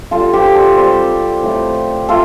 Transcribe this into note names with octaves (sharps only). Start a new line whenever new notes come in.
D3 G3 F4 A4
G4 C5
A4 D5
C3 G3 G4 C5
A2 F3 A3
A3 F4 A4